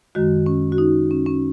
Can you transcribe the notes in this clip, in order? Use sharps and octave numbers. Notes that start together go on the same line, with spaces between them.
F#2 D#3 G#3 F#4
C#4
F#4
D#4
C#4
C#4